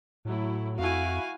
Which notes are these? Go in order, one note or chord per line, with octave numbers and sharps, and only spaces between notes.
A2 F#3 A3 E4
F2 E4 F#4 F5 G#5